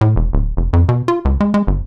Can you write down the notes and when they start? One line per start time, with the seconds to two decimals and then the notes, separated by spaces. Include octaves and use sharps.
0.01 A2
0.16 E1
0.33 D1
0.57 F1
0.73 F2
0.89 B2
1.08 F4
1.25 C#2
1.40 G#3
1.54 G#3
1.67 G1